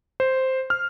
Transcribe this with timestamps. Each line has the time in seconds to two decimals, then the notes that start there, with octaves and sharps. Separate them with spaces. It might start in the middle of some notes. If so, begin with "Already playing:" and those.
0.20 C5
0.70 F6